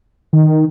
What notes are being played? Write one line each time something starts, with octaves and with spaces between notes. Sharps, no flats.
D#3